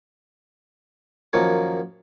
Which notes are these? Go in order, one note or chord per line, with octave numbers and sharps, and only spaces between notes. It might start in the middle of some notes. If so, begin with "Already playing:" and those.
F#2 D#3 F3 A#3 C#5